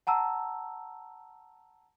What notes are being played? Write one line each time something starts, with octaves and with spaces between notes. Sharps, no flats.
F#5 A5 A#5 E6